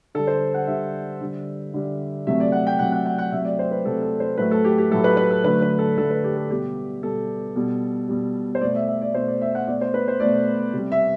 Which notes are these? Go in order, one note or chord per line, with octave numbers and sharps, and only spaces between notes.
D3 G3 A4
C5
F#5
D3 G3 E5
D3 G3
D3 G3
C3 F#3 A3 E5
D5
F#5
G5
C3 F#3 A3 F#5
F#5
F#5
F#5
C3 F#3 A3 E5
D5
C5
B4
C3 F#3 A3 A4
A4
C5
A2 F#3 A3 B4
A4
G4
G4
A2 F#3 A3 A4
B4
B4
A4
D3 F#3 A3 B4
B4
A4
D3 F#3 A3 A4
B4
G4
A4
B2 G3 G4
B2 G3 A4
B2 G3
B2 G3
C5
B2 A3 D5
E5
E5
D5
B2 A3 C5
D5
E5
F#5
B2 A3 D5
C5
B4
C5
B2 A3 D5
C3 G3
E5